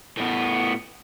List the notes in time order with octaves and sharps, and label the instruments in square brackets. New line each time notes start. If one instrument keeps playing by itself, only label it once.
[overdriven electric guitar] A2 B3